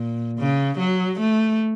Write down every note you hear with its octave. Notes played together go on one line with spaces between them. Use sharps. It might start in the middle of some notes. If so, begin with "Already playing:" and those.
Already playing: A#2
C#3
F#3
A3